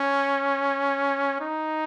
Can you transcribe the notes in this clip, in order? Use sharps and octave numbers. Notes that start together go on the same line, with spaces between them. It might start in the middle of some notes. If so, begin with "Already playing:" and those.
Already playing: C#4
D#4